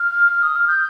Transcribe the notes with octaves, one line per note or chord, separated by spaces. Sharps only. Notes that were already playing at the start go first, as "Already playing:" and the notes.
Already playing: F6
D#6
F6
G6